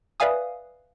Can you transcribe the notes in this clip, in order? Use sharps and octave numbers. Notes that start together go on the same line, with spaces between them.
B4 D5 E5 F5 G#5 D#6